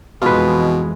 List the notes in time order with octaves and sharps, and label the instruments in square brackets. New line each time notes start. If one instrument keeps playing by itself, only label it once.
[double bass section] F2 E3 G#3 [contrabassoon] B2 [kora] F4 B4